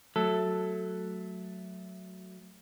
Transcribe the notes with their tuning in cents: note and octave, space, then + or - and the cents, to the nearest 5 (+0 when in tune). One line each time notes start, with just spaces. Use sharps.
F#3 +0 A3 +0 A4 +0